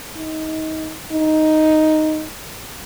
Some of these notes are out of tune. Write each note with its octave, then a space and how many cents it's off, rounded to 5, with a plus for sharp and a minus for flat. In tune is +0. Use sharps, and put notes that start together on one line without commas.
D#4 +20
D#4 +0